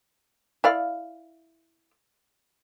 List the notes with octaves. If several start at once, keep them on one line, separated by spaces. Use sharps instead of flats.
E4 D5 F5